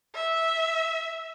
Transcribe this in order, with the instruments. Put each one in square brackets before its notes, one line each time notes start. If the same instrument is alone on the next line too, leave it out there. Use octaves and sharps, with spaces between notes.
[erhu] E5